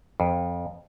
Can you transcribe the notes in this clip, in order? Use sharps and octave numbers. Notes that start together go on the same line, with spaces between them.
F2